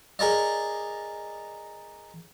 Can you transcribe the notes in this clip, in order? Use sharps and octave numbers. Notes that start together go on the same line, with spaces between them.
G#4 A#4 D5 D#5